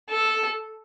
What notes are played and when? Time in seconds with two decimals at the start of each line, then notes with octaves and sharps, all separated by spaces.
0.10 A4